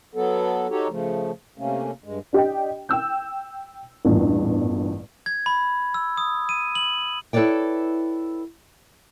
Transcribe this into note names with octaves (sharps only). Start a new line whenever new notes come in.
F#3 B3 A4
D#4 F#4 G4 A4 C#5
C#3 F3 A3
C3 A3 A#3 C#4
G2 G#3
D4 G4 D#5 G5
G5 E6 G6
A1 E2 G2 A#2
G#6
B5
E6
D#6
D#7
F#7
E4 A4 B4 C#5 D5 G5